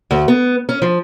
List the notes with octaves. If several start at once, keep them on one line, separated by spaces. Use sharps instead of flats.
D2
B3
C#4
F3